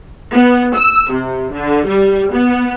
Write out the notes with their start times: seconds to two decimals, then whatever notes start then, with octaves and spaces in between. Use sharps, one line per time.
0.33 B3
0.75 E6
1.12 C3
1.53 D3
1.87 G3
2.33 B3